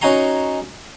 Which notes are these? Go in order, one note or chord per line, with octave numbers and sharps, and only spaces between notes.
C#4 D#4 F#4 G#5 A#5 C6